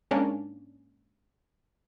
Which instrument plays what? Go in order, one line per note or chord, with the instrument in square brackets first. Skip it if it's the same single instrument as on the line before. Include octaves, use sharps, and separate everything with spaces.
[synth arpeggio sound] G#2 A#3 C#4 D4